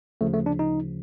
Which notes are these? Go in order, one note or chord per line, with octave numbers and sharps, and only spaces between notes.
D2 C#3 F3 A3
A3
D4
D#4